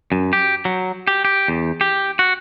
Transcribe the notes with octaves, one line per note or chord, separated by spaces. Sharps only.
F#2
G4
F#3
G4
G4
E2
G4
F#4